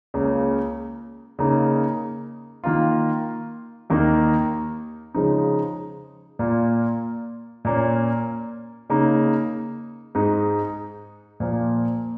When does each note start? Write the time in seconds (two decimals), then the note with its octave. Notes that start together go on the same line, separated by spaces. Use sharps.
0.14 C#2 C#3 A#3
1.39 C#3 A#3 D#4 A#4
2.64 D#3 A#3 F4
3.90 D#2 D#3 A#3 D#4 A#4
5.15 C#3 F3 G#3 D#4
6.39 A#2 A#3 F4
7.65 A#2 A#3 C#4
8.89 C#3 A#3 D#4
10.15 G#2 G#3 D#4
11.40 A#2 F3 A#3